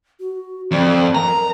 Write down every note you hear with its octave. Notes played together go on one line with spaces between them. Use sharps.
F#4
F2 D5
A#4 A#5